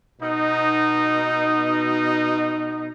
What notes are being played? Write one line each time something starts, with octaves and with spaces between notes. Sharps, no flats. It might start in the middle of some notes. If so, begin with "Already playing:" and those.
B2 D#4